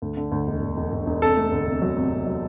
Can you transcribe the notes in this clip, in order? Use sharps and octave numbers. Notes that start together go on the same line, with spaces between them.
D2
D3
D2
E1
E1
E1
E1
E1
C3 A4
A3
D2
C3
F#3
C3
C3
F#3